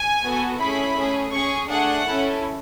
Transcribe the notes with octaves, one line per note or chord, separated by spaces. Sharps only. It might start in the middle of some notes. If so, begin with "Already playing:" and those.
Already playing: G#5
B3 F#4 A4
A3 C#4 E4 G#4 B5
A3 C#4 G#4
C#4 G#4 C#6
A3 D4 G#4 F#5
C#4 E4 A4